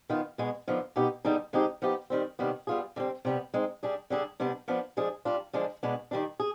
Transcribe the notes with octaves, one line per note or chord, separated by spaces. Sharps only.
D#3 B3 F4
B2 G#3 B3
D3 F3 B3 D#4
B2 B3 D#4 G4
D3 G3 B3 D#4 G#4
D3 G#3 C4 D#4 G4
F3 B3 D#4 G4
D#3 G3 C4
C3 D#3 G3 B3
G3 B3 F4 G#4
D3 G3 C4
C3 G3 B3
G#3 C4 D#4
G3 D4 G#4
D3 G3 D4 G#4
C3 G3 B3 D4
F3 B3 D4
F3 G#3 D4 G#4
G3 D4 F4
D3 F3 G#3 D4
B2 G#3 B3 D4
D#3 G3 D4
G#4